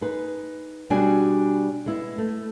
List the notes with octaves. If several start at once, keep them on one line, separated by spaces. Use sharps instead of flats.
D#4 G#4 B4
B2 G3 D4 F#4 G#4 G#5
G#3 B3 E4
A3